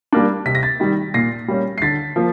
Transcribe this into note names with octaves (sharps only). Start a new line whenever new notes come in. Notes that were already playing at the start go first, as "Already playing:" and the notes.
G3 A#3 D4
C3 B6
A#6
A6 B6
D#3 G3
A#2 A#6 C7
G3 A#3 C#4
C7
D3 A6 B6
F3 A#3